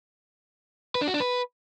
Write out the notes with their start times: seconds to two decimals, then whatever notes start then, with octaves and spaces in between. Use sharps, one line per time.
0.95 B4
1.01 D4
1.08 F#4
1.14 D4
1.20 B4